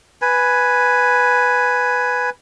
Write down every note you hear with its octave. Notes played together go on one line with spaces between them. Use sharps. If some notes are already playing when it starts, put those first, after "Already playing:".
B4 G#5